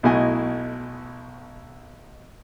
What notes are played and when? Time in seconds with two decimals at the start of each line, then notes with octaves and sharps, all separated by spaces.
0.03 B1 B2 A3 E4 D#5 G#5